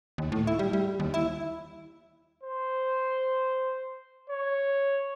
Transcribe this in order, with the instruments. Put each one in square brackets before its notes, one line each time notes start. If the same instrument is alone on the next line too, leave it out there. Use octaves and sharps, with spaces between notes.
[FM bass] D#2
A2
E4
G3
G3
D#2
E4
[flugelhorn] C5
C#5